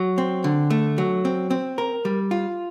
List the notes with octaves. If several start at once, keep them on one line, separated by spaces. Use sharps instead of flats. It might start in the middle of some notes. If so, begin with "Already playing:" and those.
Already playing: F#3
C4
D3
A3
F#3
C4
C4
A#4
G3
F4